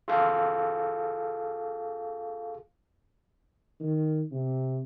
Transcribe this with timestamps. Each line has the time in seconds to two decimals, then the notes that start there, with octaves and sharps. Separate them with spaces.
0.08 F4 G#4 A4 F5
3.80 D#3
4.31 C3